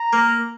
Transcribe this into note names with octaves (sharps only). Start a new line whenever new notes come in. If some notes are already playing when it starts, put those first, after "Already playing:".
Already playing: A#5
A#3